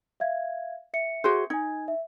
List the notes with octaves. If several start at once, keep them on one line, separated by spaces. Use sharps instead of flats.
E5 F5 G#6
E5 C#7
F#4 G#4 C5
D#4 G#5 G#6
E5